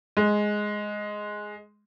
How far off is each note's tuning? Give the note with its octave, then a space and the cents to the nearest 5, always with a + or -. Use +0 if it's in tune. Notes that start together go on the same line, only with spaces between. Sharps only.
G#3 +5